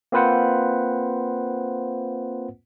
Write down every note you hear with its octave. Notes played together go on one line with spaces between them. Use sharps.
A#3 C4 F4 B4 C5 F#5